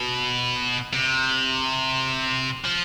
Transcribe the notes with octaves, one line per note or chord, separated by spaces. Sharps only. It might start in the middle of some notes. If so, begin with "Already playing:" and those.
Already playing: B2
C3
F3